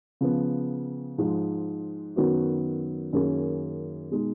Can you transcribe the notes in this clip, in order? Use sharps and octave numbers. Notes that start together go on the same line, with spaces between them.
C#3 F3 B3
G#2 F3 G#3
F#2 D#3 F#3 B3 F#4
F#2 D#3 A#3 C#4 G#4
B2 G#3 D#4